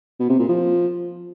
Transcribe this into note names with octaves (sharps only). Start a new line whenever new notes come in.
B2
C3
A#2
F3